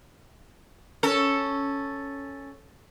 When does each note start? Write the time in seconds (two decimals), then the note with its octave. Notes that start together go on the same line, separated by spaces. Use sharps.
1.03 C#4 A4